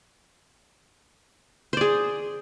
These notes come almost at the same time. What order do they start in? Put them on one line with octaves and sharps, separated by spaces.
C5 D5 G#4